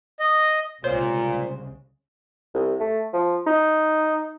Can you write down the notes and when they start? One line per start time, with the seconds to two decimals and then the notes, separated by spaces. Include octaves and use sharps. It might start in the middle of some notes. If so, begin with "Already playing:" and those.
0.20 D#5
0.84 C2 A#2 C#3 G#3 C5 C#5
2.54 C2
2.80 A3
3.13 F3
3.47 D#4